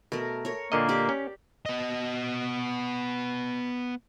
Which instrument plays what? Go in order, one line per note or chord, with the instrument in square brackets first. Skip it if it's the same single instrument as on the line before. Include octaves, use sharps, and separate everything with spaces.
[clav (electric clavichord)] B2 [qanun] A3 A#4
[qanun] A#4 C#5
[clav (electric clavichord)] A#2 D3 D#5 [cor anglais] A#3
[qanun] G4 D5
[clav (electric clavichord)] C#4
[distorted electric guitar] B3 D#5